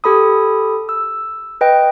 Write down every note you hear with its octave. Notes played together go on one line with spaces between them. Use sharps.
G4 A4 B5 D#6
E6
B4 D#5 G5